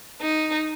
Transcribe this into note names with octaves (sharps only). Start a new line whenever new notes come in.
D#4